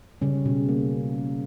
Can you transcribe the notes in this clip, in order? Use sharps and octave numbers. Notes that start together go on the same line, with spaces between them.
C#3 G3 C#4
B2
A#3